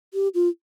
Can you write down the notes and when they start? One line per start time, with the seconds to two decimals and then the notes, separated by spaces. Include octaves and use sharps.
0.14 G4
0.35 F4